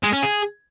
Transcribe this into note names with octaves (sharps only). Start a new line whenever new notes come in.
G#3
C#4
G#4